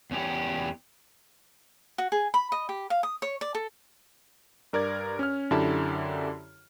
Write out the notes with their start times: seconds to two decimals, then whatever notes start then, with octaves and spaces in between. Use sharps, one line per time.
0.11 E2 C#4 G4
1.98 F#4
2.12 G#4
2.34 B5
2.52 D#5
2.69 G4
2.90 F5
3.03 D#6
3.22 C#5
3.41 D5
3.55 A4
4.73 G2 A#4 D5 G#6
5.19 C#4 F6
5.51 F#2 D3 E4 G4 A5 B5